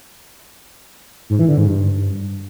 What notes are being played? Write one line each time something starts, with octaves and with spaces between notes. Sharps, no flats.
G#2
E3
D3
G#2
G2